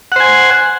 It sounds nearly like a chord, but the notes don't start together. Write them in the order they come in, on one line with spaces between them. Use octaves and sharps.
F#5 C5 G#5